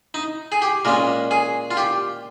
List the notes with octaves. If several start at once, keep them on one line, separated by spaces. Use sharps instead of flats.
D#4
G#4
G4
A#2 G#3 C#4 A#4
G#4
F4
G4